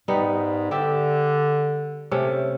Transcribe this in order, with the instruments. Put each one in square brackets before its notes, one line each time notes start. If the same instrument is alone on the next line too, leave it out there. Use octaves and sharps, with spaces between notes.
[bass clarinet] G#2 [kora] G3 B3 D#4
[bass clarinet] D3 [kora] G4 D5 E5
[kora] C3 A3 C#4